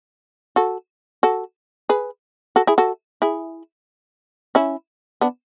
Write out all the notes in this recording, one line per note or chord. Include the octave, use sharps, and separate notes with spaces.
F#4 A4
F#4 A4
G#4 B4
F#4 A4
E4 G#4
F#4 A4
E4 G#4
C#4 E4
B3 D4